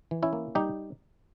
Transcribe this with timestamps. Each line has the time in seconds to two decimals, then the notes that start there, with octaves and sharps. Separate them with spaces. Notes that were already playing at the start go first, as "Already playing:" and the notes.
0.11 E3
0.22 C#4 E4
0.33 A#3
0.55 G3 D#4 G4